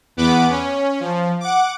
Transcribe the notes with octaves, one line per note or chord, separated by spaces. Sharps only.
E2 B3 B4 D6
C#4
F3
F#5 D6